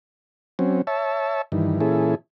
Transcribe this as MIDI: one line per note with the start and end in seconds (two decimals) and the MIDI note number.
0.59 0.82 54
0.59 0.82 60
0.59 0.82 61
0.87 1.42 73
0.87 1.42 76
0.87 1.42 81
1.52 1.80 43
1.52 1.80 51
1.52 1.80 52
1.80 2.15 46
1.80 2.15 52
1.80 2.15 61
1.80 2.15 64
1.80 2.15 68
1.80 2.15 69